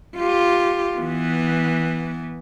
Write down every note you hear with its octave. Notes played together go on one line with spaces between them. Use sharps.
F4 G4
E3 B3